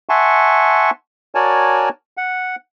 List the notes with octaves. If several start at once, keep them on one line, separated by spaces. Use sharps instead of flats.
E5 F#5 G#5 A5 C6 C#6
F#4 A#4 C#5 D5 G#5 A5
F#5